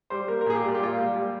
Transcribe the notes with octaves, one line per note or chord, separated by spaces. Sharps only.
G3 C5
A#3 A#4
A#4
A#2 G#4
G4
G3 F4
G4
A#2 F4
G3
G3